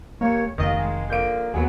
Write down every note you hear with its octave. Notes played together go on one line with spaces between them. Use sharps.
D#2 A#3 G4 C#5
F1 D#2 D#3 C4 D#5 F5
G#3
D3 F3 A#3 G6 D7
D#2 F#3 B3 G#4